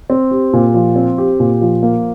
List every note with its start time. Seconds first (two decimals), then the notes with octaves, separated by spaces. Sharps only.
0.10 C4
0.31 G4
0.53 A#2
0.74 F3
0.96 C4
1.18 G4
1.40 A#2
1.61 F3
1.83 A#3